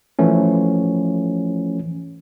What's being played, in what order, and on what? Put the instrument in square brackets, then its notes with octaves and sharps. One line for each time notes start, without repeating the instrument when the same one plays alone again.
[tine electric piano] E3 F3 A3 C#4